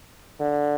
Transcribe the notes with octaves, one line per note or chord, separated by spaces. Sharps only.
D3